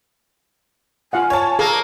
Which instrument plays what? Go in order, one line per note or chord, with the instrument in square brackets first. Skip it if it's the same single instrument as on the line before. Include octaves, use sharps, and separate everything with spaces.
[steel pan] F4 F5 F#5 [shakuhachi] G#5
[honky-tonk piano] C#5 A5
[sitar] A#3 [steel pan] G#4 A4